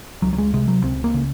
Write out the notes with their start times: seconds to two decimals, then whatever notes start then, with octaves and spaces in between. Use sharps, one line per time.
0.22 C#2 F#3
0.33 F#3
0.38 G#3
0.53 C3 G#3
0.68 F#3
0.83 C#2 C4
1.04 A#3
1.14 C#3